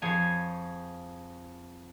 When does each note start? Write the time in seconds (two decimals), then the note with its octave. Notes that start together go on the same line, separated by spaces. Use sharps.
0.02 F2 F3 G#4 C#5 G#5